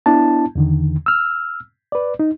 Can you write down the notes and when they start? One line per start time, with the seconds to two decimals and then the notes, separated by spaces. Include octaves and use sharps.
0.06 B3 D4 E4 A5
0.55 E2 D3 D#3
1.06 E6 F6
1.92 B4 D5
2.19 D#4